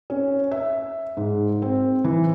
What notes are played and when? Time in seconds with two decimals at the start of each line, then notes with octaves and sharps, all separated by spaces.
0.10 C#4
0.51 E5
1.17 G#2
1.62 C4
2.04 E3